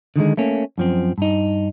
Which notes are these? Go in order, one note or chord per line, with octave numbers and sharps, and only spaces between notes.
D3 D#3 G3 G#3
A3 A#3 C#4
F#2 F3 C4
G2 D#4